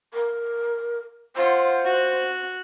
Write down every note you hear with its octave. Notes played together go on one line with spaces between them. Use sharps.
A#4
F4 C5 F#5
F#4 F#6